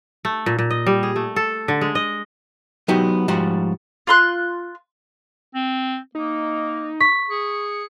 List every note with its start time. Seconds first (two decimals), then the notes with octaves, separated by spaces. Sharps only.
0.25 A3
0.46 A#2
0.59 A#2
0.70 D#5
0.86 G3
1.03 G#4
1.16 A3
1.36 A4
1.68 D3
1.81 G#3
1.95 D#5
2.88 F#3 B3 D#4 F#4 G4
3.28 G#2 F3 G3 F#4
4.07 F4 C6 F#6
5.54 C4
6.15 A#3 D#4
7.00 C#6 B6
7.30 G#4 C#7